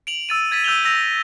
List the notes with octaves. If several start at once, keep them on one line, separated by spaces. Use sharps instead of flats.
D7 F7 F#7
E6 A6 D#7
G#6 A6 B6 D#7
E6 G6 D#7 F7 G7
E6 A#6 F7
A#6